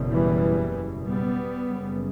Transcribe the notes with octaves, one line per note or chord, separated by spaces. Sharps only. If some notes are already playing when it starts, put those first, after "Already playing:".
Already playing: F#1 E2 B2
E3 G3
G3 B3
F#1 F#2 C#3